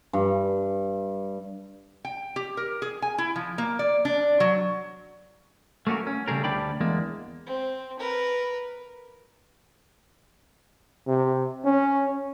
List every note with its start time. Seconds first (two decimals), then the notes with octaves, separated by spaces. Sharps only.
0.13 G2
2.05 G5
2.36 G4
2.57 A#4
2.82 G#4
3.02 G#5
3.18 E4
3.36 F3
3.58 A#3
3.79 D5
4.05 D4
4.40 F#3
5.87 A3 A#3 C#4 F#4 A#4
6.07 C#4
6.28 C#3 G3 A3 G#4 A#4
6.44 D2 G3 D4 D5 G5 B5
6.80 E2 G#3 A#3
7.46 C4
7.99 A#4 B4
11.07 C3
11.64 C#4